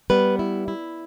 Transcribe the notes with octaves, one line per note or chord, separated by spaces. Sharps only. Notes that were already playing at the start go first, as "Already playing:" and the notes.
G3 B3 B4
E4
E4